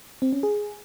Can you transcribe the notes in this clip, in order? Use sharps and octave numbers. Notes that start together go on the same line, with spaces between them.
C4
C#4
G#4